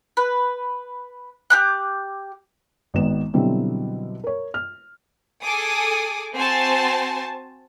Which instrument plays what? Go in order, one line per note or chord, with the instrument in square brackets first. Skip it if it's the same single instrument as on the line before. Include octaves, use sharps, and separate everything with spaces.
[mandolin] B4
G4 D6 F#6
[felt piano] G#1 D#3 B3 E7
B2 D3 F#3 G3 C4 E4
A#4 C#5
F6
[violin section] G#4 A4 G#5 D6 D#6
C4 F#4 C5 G#5 A5